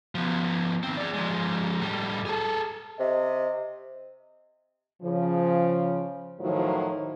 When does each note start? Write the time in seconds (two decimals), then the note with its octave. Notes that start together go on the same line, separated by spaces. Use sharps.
0.15 F3 B3
0.83 D#3 C4
0.97 G#4 D5
1.14 F3 G#3
1.81 A2 G3
2.25 G#4 A4
2.99 C3 D#5
5.01 C#3 F3
6.41 A2 D#3 F3 F#3